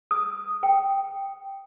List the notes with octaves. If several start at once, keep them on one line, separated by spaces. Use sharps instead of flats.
D#6
G5